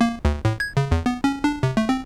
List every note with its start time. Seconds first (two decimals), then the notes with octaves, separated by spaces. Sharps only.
0.01 A#3
0.25 D2
0.45 A2
0.60 G#6
0.77 C#3
0.91 E2
1.06 B3
1.24 C#4
1.44 D4
1.63 C3
1.77 A3
1.89 C4